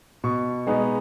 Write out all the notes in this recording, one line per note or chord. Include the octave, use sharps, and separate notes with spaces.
B2 C#6
G#3 B3 D#4